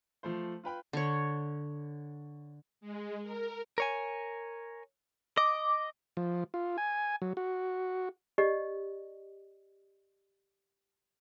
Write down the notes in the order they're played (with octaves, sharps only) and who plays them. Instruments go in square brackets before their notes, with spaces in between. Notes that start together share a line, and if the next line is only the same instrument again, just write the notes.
[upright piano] F3 A3 C5
F4 B4 G5 B5
[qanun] D3 C#5
[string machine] G#3
A#4
[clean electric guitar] A#4 C#5 G#5
[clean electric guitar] D#5 [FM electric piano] D6
[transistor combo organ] F3
F4
G#5
F#3
F#4
[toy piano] G4 D5 D#5